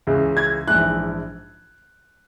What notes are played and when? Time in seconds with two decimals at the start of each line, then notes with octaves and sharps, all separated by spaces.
0.07 C#2 C#3 E3
0.37 G#6
0.67 A#1 G#2 E3 F#6